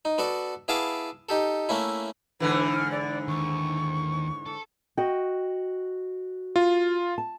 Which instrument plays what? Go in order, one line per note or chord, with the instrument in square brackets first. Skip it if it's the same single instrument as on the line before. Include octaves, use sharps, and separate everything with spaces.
[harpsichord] D#4
B3 F#4 A4 D5
B3 E4 G#4 F5 A5 D6
D#4 G4 A4
A3 A#3 C#4 E4
[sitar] G#2 D3 E3 [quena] B4
[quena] F6
D5
[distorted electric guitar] D#2 [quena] C#6
[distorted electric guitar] A4
[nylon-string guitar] F#4 D#5 G5
[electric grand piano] F4
[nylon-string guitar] A5